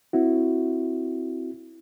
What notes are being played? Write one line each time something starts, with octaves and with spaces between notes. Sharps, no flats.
C4 E4 F#4